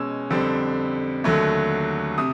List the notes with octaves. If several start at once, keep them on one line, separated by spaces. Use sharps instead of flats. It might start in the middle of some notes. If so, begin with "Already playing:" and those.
Already playing: B2 G#3 C#4 E6
F2 D3 G3 C4
D#2 D3 F#3 A3
C3 D#6